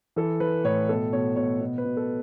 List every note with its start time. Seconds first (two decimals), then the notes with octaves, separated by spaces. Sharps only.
0.16 E3 A4
0.40 E3 B4
0.64 A2 C#5
0.89 B2 A4
1.13 B2 C#5
1.36 B2 C#5
1.61 B2
1.78 B4
1.85 B2
1.97 A4